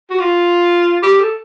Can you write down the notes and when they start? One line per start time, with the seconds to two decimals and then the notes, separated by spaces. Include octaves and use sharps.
0.10 F#4
0.19 F4
1.02 G4
1.20 A4